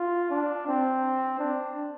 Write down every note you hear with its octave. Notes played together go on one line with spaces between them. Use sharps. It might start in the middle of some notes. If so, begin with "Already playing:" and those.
Already playing: F4
D4
C4
D4